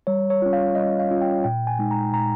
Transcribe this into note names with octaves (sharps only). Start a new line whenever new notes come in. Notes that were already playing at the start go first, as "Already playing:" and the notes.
G3 C#5
C#5
C#4 F4
F5
G3 D#5
F5
C#4 F4
G5
A#2 G5
G#5
G#3 D#4
A#5
A#2 A#5